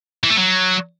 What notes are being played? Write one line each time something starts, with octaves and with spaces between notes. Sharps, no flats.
E3
A3
F#3